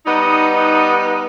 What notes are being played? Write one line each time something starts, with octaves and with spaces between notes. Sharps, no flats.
G3 B3 D#4